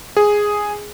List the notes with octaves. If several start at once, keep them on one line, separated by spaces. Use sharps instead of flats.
G#4